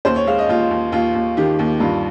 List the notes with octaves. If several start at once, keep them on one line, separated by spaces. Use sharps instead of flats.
D#2 C5
C#5
G#3 F5
D#5
D#2 F4
D#2
D#2 F4
D#2
D#3 G4
D#2
G2 F4